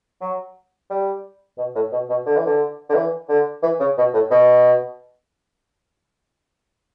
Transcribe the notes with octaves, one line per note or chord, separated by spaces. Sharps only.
F#3
G3
B2
A2
B2
B2
D3
E3
D3
D3
E3
D3
E3
C#3
B2
A2
B2